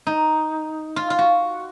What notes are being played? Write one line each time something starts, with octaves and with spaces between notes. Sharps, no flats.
D#4
F4
F4
F#4